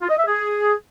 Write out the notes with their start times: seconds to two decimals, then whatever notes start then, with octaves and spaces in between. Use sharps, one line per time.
0.01 F4
0.09 D#5
0.17 E5
0.26 G#4